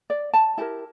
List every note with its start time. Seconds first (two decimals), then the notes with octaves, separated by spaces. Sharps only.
0.10 D5
0.34 A5
0.58 E4 G4 A#4 A5